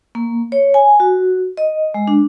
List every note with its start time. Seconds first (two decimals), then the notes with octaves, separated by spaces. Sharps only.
0.15 A#3
0.52 C#5
0.74 G#5
1.00 F#4
1.57 D#5
1.94 G#3
2.08 D4